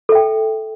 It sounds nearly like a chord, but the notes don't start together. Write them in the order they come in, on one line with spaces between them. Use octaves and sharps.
A4 E5 G5